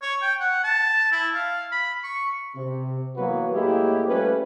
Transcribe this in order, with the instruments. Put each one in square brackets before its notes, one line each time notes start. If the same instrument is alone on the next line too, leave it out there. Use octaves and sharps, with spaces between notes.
[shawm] C#5
G5
F#5
A5
E4
F5
B5
C#6
[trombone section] C3
E3 F#3 A#3 B3 F#4 B4
A2 G#3 A#3 E4 G4
F3 G3 A3 C#4 B4